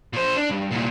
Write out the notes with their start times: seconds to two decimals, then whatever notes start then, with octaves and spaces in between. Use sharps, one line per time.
0.13 A#2 C5
0.37 D4
0.51 G2
0.72 C2 A#2